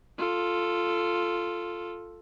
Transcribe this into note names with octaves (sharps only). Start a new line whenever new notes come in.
F4 A4